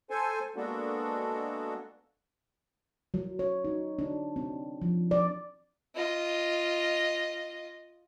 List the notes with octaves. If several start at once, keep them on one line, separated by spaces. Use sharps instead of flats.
A4 C5 G#5
G#3 A#3 B3 D4 F#4 A4
F#3
C#5
D#4
D4
C4
F3
D5
F4 D#5